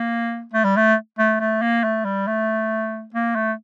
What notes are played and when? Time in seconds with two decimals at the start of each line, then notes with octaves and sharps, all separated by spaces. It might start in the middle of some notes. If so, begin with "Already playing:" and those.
Already playing: A#3
0.53 A3
0.64 G3
0.76 A3
1.18 A3
1.40 A3
1.62 A#3
1.84 A3
2.05 G3
2.27 A3
3.14 A#3
3.35 A3